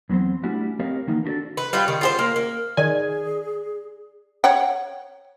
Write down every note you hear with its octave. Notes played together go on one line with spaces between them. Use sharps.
E2 F#3 B3 C4 C5
G3 A3 C#4 D4 E4 F#4
C4 G4 A#4 C#5 D#5 F5
D#3 E3 A#3 B3 D#4
D4 E4 F#4 G4 A4 D5
B4
G3 F4 B4
D#3
F4 G4 C5
A#3
A#3
D#3 G#4 D5 G#5
C#5 F#5 G5